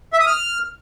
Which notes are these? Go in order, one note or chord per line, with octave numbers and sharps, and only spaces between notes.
E5
D#6
F6